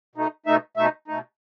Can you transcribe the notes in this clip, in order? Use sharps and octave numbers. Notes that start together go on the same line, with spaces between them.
B2 A3 D#4
B2 A3 D#4 E5
B2 A3 D#4 E5
B2 A3 D#4